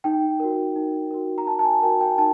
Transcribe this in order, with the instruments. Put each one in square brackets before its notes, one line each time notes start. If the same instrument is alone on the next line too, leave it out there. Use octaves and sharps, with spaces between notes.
[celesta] D#4 G5
F#4 A#4
D#4
F#4 A#4
A#5
D#4 A5
A5
G#5
F#4 A#4 G5
G5
D#4 A5